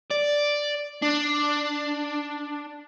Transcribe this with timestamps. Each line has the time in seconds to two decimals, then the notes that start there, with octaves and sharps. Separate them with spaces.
0.11 D5
1.03 D4